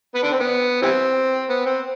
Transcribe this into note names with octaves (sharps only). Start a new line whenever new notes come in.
B3 B4
D3 D4
C4
B3
E3 G3 C4
B3
C4